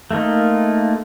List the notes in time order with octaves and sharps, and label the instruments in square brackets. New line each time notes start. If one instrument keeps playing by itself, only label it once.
[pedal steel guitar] A3 A#3 D#4 F4